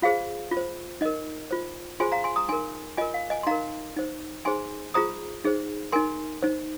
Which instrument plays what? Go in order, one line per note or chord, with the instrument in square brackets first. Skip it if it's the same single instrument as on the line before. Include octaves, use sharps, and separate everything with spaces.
[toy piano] F4 G#4 C5 F5
F4
C5
D#4 A#4 D#5
F4 C5
F4 G#4 C5 G#5 C6
F5 A#5
G#5 C6
A#5 D#6
D#4 A#4 G#5 C6
F4 A#4 D#5 G#5
F5
D#5 G#5
C6
D#4 A#4 F5 A#5
D#4 C5
D#4 G#4 C5 G#5 C6
F4 G#4 C5 A#5 D#6
D#4 G#4 C5
D#4 A#4 G#5 C6
D#4 C5